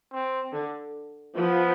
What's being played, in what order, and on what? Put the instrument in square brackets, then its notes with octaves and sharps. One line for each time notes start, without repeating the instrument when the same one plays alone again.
[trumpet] C4
[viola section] D3
[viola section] F3 [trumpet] B3